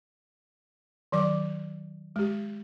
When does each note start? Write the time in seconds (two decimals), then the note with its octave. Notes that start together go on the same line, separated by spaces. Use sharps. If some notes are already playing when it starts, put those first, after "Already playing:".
1.12 D#3 F#3 D5 D6
2.16 G#3 G4